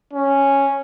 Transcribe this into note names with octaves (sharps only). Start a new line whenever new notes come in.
C#4